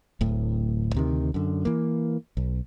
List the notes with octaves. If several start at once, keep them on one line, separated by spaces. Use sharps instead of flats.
D1 A2
D2 C3 D#3
F#2 D3
E3 A#3
B1